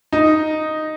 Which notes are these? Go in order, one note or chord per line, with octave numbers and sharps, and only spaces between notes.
D#4